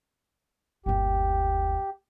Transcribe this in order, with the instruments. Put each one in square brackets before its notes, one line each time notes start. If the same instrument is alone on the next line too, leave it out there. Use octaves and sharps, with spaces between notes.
[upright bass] G1 D#2 [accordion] G4